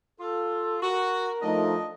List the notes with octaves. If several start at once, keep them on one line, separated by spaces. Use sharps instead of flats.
F4 A4
F#4 A#4
F3 A3 D4 D#4 D#5